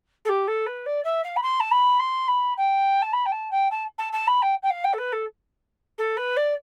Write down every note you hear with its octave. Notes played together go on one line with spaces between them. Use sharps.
A4
G4
A4
B4
D5
E5
F5
B5
C6
A5
B5
C6
B5
G5
A5
B5
G5
A5
G5
A5
A5
A5
B5
G5
G5
F5
G5
A4
B4
A4
A4
B4
D5